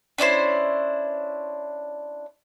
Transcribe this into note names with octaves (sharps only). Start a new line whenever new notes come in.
C#4 D4 E4 C5